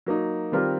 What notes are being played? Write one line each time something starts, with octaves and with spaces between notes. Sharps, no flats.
F#3 A#3 D#4
D#3 G3 C4 F4 A#4